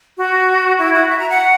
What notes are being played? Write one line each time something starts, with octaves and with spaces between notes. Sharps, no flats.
F#4
E4
F#4
E5
A#5
F#5